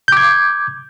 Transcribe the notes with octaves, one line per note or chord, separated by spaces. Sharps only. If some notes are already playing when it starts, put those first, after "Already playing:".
D6 G6 G#6